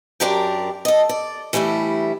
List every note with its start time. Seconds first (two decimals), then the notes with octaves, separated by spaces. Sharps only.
0.20 F#2 D4 G4 A#4 G5
0.85 A4 D#5
1.09 D5
1.53 E3 G3 A3 D4 E4